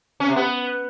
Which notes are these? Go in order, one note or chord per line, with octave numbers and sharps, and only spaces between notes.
C#4
C3
B3